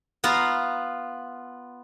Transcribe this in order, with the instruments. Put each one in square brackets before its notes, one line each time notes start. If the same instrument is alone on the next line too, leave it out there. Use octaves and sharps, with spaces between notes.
[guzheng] B3 F4 F5 A#5